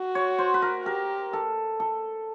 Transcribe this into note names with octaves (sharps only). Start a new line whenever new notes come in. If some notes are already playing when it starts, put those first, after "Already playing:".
Already playing: F#4
C#5
C5
B4
A#4
G4 A#4
A4
A4